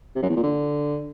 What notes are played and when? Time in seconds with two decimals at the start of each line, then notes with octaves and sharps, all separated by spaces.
0.16 C3
0.22 F#2
0.29 E2
0.36 A#2
0.43 D3